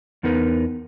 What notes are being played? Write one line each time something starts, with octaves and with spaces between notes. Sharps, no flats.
E2 B3 D#4 A#4 B4